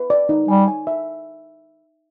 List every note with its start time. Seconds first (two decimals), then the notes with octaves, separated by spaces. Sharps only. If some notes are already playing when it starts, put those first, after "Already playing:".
Already playing: B4
0.10 D5
0.29 D#4
0.48 G3 G#5
0.68 G#5
0.87 E5